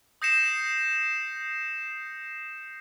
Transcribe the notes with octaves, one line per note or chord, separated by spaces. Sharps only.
D#6 G6 A#6 C7 C#7 E7